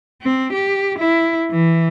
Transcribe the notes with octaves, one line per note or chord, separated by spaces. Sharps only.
C4
G4
E4
E3